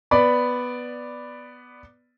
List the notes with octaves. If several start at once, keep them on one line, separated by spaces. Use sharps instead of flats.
B3 D5 B5